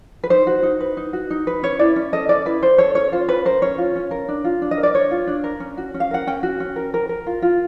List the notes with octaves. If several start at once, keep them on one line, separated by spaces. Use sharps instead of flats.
B4
D#4 C5
F#4
D#4
B4
D#4
F#4
D#4
B4
C#4 C#5
E4 D5
C#4
A4 D#5
C#4 D5
E4 B4
C#4 C5
A4 C#5
C#4 C#5
F4 C5
C#4 B4
A#4 C5
C#4 C#5
F4
C#4
A#4
D4
F4
D4
D#5
A#4
D5
D4 C#5
F4
D4
A#4
C#4
F#4
C#4
F5
A#4 F#5
C#4 G5
F#4
C#4
A#4
A#4
A#4
F4
F4